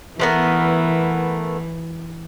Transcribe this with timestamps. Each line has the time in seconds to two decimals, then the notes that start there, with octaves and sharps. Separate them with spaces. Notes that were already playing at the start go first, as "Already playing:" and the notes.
0.20 E3 A3 B3 A#4